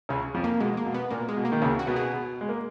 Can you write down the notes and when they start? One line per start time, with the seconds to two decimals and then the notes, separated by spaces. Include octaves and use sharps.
0.09 C#2 C#3 C#4
0.34 F2 F3
0.44 A#3
0.60 B2 G#3
0.77 A#3
0.86 B2
0.94 B3
1.10 A#2 A#3
1.29 G#3
1.37 B2
1.45 A#3
1.52 D#3
1.62 C#2 C#3 A#3
1.79 F#4
1.87 B2 B3
1.96 G#4
2.41 G#3
2.49 A#3